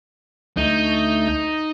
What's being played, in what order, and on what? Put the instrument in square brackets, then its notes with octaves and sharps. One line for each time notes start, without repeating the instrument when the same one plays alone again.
[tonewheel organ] D2 A3 G6 [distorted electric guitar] D#4